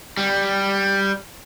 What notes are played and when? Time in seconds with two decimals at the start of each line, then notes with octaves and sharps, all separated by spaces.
0.17 G3